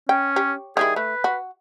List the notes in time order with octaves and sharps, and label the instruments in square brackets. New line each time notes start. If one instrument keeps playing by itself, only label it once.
[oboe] C#4 [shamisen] G5
[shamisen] G4 C#5
[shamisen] D#3 G3 E4 [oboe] G#4
[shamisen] A3 [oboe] B4
[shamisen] F#4